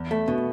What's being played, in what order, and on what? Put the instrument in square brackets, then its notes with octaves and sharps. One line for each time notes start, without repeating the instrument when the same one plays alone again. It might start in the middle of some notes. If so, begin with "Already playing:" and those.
Already playing: [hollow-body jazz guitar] E2
A3
[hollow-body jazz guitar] B2 [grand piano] B3